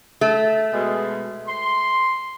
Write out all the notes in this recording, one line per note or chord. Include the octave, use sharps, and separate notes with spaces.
A3
B2 G#3
C6